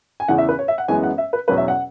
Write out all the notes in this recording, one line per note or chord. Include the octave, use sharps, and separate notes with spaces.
G#5
E2 C#3 E3 F#5
E5
B4
C#5
E5
F#5
F#2 E3 G#3 B3 G#5
F#5
E5
B4
E2 B2 F#3 C#4 B4
E5
F#5